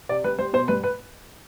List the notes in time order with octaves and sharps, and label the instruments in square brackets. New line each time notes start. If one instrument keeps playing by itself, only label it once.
[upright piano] C3 D5
G3 B4
G3 C5
B2 C5
G2 B4
B4